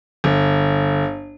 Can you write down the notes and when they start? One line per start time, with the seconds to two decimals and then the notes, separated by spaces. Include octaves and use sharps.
0.24 G1